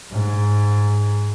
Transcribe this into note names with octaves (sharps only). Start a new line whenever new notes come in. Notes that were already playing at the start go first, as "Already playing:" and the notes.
G#2